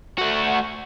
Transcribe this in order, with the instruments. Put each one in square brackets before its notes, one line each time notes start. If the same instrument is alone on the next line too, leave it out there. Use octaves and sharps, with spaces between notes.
[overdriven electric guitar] A3 F#4